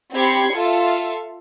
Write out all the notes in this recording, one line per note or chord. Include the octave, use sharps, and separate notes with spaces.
C4 G4 B5 G#6 C7 C#7
F4 A4 E5 F5